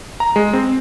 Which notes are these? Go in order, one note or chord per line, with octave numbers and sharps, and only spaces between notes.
A#5
G#3
C4